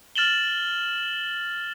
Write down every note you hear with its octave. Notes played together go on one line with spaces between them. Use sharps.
F6 A6 E7 F#7 G7